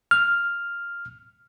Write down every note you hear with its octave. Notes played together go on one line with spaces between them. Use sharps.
F6